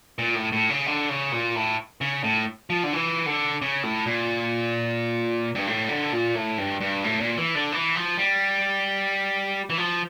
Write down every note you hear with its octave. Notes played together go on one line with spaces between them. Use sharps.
A#2
A2
A2
C#3
D3
C#3
A#2
A2
C#3
A2
F3
D3
E3
D3
C#3
A2
A#2
G2
A2
D3
A#2
A2
G2
G2
A2
A#2
E3
D3
E3
F3
G3
E3
F3